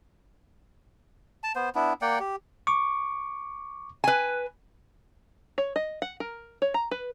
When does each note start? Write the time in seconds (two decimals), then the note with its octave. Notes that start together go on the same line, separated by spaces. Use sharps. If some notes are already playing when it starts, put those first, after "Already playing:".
1.44 A5
1.55 B3 C5
1.75 B3 D4 E4
2.02 A#3 D5 F#5 G5
2.20 G4
2.67 C#6 D6
4.04 B4 G#5
5.58 C#5
5.76 D#5
6.02 F#5
6.20 A#4
6.62 C#5
6.74 A#5
6.91 B4